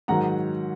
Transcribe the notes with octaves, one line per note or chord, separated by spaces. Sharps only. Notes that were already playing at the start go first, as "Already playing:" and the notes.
G#2 D#3 F#3 F#5 A#5